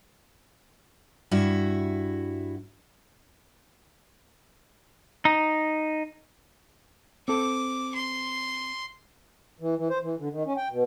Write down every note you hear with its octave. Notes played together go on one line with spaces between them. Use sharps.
G2 E4 F#4
D#4
C4 A4 D6
C6
E3
E3
C5
E3
D3
D#3
C#4
G5
B2